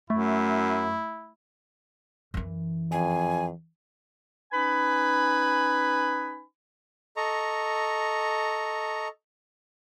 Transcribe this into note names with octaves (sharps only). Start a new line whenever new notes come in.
F#2 A3 E4
F#2 E3
F2 G#5
C#4 D#4 B4 G#5 B5
A4 D#5 A#5 C#6